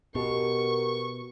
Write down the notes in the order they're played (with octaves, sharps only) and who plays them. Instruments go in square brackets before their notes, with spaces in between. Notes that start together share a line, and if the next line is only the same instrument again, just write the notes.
[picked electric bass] B2 [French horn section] F#4 A#4 [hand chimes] G4 [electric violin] C#6